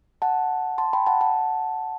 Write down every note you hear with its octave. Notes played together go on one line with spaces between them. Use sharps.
F#5 A5
A5 C6
G5 B5
F#5 A5
F#5 A5